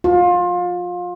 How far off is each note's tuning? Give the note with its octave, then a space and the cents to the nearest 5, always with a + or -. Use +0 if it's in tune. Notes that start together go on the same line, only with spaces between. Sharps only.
F4 +25